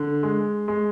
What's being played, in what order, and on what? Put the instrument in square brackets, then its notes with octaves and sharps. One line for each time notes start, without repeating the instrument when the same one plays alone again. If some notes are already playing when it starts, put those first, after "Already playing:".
Already playing: [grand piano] D3
G#3
G#3